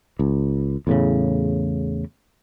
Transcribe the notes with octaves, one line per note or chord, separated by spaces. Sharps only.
C#2
E2 A2 C#3